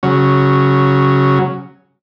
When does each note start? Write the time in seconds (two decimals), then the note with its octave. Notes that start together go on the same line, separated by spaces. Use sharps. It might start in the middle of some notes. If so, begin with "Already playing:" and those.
0.03 C#3 F#3